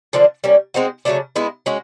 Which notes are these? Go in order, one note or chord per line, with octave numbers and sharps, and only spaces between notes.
D3 F3 A#3 D4
G3 A#3 C#4
G#3 C4 D#4 F#4
C#3 F#3 A3 D4
G#3 B3 E4
G#3 C#4 F#4